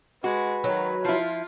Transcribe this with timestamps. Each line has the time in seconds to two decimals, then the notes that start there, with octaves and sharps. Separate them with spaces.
0.24 G#3 F#4 B4
0.64 D#3 F#3
1.05 F3 E4 F4